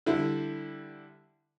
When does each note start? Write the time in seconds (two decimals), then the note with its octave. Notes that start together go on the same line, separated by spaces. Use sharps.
0.06 D3 G3 E4